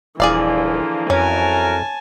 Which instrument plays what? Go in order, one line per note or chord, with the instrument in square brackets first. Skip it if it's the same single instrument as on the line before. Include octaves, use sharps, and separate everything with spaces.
[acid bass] D#1 [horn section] D3 F3 A#3 [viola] E3 [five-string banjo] G#4 D5 F5
[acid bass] F2 [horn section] E3 F#3 A#4 [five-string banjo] C#4 [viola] G#5 A5